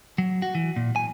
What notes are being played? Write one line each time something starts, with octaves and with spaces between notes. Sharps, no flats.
F#3
F#4
E3
A#2
G#5